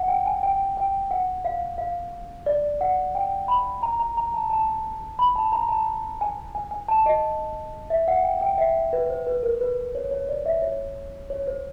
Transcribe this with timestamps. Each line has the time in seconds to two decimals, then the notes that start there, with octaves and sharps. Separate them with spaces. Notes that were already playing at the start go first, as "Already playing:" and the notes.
Already playing: F#5
0.08 G5
0.26 G#5
0.43 G5
0.77 G5
1.11 F#5
1.45 F5
1.78 F5
2.46 D5
2.81 F#5
3.15 G5
3.48 B5
3.83 A#5
4.00 A#5
4.17 A#5
4.34 A5
4.50 A5
5.19 B5
5.36 A5
5.52 A#5
5.69 A5
6.21 G#5
6.55 G#5
6.71 G#5
6.88 A5
7.06 D#5
7.90 E5
8.08 F#5
8.24 G5
8.41 G5
8.58 E5
8.93 B4
9.10 C5
9.27 B4
9.43 A#4
9.61 B4
9.95 C#5
10.11 C#5
10.29 D5
10.46 E5
10.62 C#5
11.30 C#5
11.47 C5